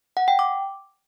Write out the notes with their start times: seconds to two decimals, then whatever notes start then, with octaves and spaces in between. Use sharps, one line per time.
0.17 F#5
0.28 G5
0.39 D6